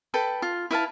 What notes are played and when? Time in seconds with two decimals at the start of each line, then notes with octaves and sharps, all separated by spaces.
0.14 A4 B4 G5 B5
0.42 F4
0.71 E4 B4 F5 A5